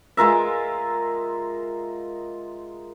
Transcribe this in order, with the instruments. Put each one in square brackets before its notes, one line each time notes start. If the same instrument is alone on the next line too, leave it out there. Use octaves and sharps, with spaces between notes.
[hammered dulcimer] G#3 F4 A#4 E5